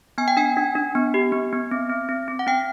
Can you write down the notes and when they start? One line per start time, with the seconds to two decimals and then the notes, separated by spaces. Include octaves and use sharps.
0.18 B3 G#5
0.28 G5
0.37 D4 G#5
0.57 D4
0.75 D4
0.95 B3
1.14 G4
1.32 B3
1.53 B3
1.71 C4
1.90 C4
2.09 C4
2.28 C4
2.39 F#5
2.47 C4 G5